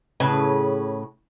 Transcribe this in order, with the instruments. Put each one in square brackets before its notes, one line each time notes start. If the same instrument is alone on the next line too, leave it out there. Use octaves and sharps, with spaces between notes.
[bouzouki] A2 C#3 B4